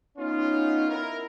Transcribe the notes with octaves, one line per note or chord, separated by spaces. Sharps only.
B3 C#4 D#4 F4
E4 A#4